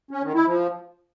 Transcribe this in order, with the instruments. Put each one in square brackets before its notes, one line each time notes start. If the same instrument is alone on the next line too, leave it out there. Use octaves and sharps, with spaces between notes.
[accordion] C#4
D#3
E4
F3